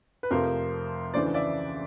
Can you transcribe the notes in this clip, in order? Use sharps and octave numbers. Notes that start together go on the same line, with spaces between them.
B4
F2 C3 F3 A3 C4 A#4 C5
D2 C#3 E3 A3 C5 D5
D5 E5